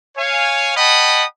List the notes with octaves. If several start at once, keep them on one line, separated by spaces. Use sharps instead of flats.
C#5 F5 G#5
D#5 F#5 G5 A5 B5 D#6